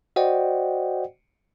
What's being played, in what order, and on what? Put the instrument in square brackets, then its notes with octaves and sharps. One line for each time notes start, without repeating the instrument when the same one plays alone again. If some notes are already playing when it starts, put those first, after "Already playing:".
[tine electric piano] F#4 C5 D5 D#5 F#5 G5